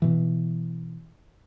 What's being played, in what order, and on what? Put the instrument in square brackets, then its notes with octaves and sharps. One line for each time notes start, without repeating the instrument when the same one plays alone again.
[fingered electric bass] B2 E3